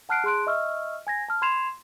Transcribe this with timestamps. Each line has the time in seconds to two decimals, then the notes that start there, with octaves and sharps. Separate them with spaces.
0.09 F#5 A5 F6 F#6 C7 D7
0.24 G#4 A5 C6 F#6 D7
0.47 D#5 E5 C#6 E6 F6
1.07 G#5 G#6 A#6
1.28 A5 F6
1.42 B5 C6 G#6 C7 E7 F7